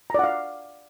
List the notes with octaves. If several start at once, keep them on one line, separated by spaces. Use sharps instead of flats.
D5 F5 F#5 A#5